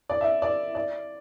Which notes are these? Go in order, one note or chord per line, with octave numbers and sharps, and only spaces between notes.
D5
E5
D5
D5